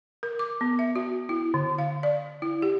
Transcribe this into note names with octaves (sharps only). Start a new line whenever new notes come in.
A#4
D6
B3
E5
F#4
E4
D3
F5
D5
E4
G4